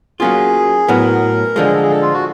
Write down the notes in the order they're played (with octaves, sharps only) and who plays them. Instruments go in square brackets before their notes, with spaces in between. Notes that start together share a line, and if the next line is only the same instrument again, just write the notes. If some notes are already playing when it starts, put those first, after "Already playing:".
[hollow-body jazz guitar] F#3 A#3 C#4 F4 [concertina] G#4
[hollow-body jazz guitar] A2 F#3 B3 E4 [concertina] A#4
[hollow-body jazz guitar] D3 F3 G#3 [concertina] A4
[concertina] G#4
A4
G#4
A4
F4
F#4